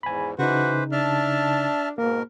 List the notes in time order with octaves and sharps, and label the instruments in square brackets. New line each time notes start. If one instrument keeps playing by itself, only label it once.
[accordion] E2 G#2 [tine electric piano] G#5 B5
[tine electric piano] C#3 D#4 [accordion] E3 B4 C5 [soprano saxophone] F#4
[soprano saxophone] D4 [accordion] E5 A5 F6
[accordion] G#2 B2 A#4 [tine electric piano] A#3